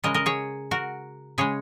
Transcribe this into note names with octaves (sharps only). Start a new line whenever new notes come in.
C#3 G#3 A#4 D#5
A#4 D#5
G#4 C#5
F#4 A#4
C#3 G#3 G#4 C#5